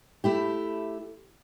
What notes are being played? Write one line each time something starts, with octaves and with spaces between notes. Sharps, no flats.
A3 E4 G4